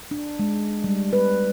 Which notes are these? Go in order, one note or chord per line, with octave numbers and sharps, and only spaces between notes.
D4
G#3
G3
B4